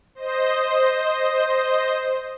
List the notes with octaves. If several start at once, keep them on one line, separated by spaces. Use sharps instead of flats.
C5 D#5